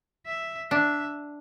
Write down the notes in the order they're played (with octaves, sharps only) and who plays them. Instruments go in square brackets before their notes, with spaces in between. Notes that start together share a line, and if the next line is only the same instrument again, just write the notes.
[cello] E5
[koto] D4 [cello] E5